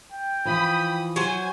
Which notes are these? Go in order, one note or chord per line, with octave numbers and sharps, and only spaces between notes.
G5
E3 F3 B5 D#6
F#3 C5 G#5